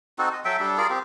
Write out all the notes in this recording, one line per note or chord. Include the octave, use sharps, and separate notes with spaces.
C4 D#4 F#4 A4
D#5
F#3 A4 E5 G5
G3 D4 A4
F4 G#4 A#4 D5
C4 G4